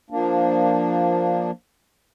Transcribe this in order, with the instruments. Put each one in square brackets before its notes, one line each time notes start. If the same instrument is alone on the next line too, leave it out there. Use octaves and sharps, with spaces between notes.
[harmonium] F3 A#3 D4